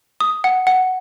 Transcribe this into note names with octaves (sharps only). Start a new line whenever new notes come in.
D#6
F#5
F#5